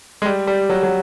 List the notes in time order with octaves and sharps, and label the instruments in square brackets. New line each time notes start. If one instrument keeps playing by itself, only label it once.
[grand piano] G#3
G3
G3
F#3
F#3